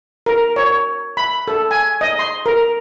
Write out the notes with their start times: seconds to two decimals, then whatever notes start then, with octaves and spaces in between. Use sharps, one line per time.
0.26 A#4
0.56 C#5
1.17 B5
1.48 A4
1.71 G#5
2.01 D#5
2.19 C6
2.46 A#4